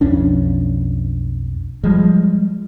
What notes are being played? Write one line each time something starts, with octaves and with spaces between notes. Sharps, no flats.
B1 F2 C#4 D4
F3 G3 G#3